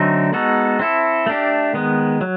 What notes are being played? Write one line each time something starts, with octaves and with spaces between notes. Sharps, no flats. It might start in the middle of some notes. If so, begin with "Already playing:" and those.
Already playing: D3 F#3 A3 C4 D#4
G#3 B3 D#4 F#4 A4
C4 E4 A4
A3 D4 G4
D#3 G#3 B3
F#3